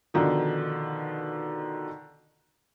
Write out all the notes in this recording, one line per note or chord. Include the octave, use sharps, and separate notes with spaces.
B2 D3 D#3 F3